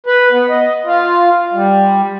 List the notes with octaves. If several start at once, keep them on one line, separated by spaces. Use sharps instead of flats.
B4
B3
D#5
F4
G3